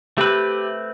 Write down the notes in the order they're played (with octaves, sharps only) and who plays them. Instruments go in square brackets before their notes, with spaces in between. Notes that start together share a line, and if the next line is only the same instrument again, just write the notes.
[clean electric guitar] A3 C4 B4 [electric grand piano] G4